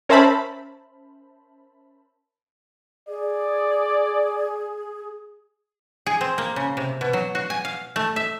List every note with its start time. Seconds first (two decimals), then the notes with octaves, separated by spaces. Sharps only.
0.09 C#4 A#4 C5 E5 A5 B5
3.08 G#4 D5
6.06 G#4
6.21 C4
6.38 A#3
6.56 C#3
6.77 C3
7.01 B2
7.13 F#3
7.35 F#4
7.50 G#5
7.65 F5
7.96 A3
8.16 E5